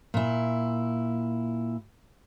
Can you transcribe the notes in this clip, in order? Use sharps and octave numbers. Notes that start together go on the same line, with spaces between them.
A#2 E4